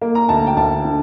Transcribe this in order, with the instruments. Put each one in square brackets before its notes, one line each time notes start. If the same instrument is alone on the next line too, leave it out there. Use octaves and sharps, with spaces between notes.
[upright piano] A#3
A#5
D2 A5
G5
D2 A5
D3